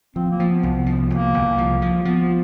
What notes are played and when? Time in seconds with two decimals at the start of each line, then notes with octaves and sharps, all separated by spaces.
0.16 F3 C4
0.31 A#3
0.40 F3
0.47 B3
0.63 C2
0.86 F3
1.10 C2 A#3
1.34 C2
1.58 F3
1.82 F3
2.05 F3 B3